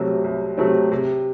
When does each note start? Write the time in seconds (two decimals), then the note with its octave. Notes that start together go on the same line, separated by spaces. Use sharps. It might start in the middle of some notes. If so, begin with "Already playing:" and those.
Already playing: C2 C3 F#3 A3 C4
0.24 C2
0.58 C3 F#3 A3 C4
0.92 C3